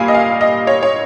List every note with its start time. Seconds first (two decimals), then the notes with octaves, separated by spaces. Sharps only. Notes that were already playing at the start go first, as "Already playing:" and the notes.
Already playing: A#2 G3 A#3 F5 G#5
0.08 D#5
0.14 F5
0.41 D#5
0.67 C#5
0.83 C#5